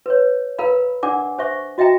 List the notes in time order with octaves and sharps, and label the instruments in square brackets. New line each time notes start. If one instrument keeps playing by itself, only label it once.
[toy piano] B4 C#5
A#4 B4 F5 A#5 B5
D4 A#4 D5 F#5 G#5 D6
C5 E5 C#6
F#4 D#5 E5 G5 A#5